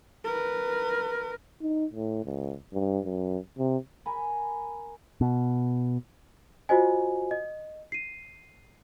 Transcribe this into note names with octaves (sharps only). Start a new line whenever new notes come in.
A#4 B4
D#4
A2
C#2
G2
F#2
C3
A#4 G#5 B5
B2
F4 F#4 C5 D#5 G#5
D#5
C7 D#7